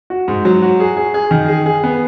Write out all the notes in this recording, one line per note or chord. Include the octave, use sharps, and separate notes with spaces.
F#4
G#2
F#3
F#4
G#4
G#4
G#4
D#3
G#4
G#4
B3